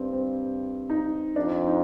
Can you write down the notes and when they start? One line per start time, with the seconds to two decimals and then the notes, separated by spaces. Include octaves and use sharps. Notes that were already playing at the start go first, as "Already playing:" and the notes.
Already playing: G2 C4
0.13 C4
0.90 D#4
1.36 F2 D4
1.67 D#4